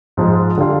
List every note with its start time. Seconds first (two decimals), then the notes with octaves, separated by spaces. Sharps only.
0.17 G#2 F3 G#3
0.57 D3 G3 D4 F4